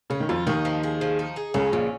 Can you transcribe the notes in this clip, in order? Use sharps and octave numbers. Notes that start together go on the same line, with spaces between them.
C#3 C#4
D#3
F2 F3 F4
D#2 D#3 D#4
F3
G#4
F3
D#4
G#4
C#2 C#3 C#4
A#1 A#2 C#3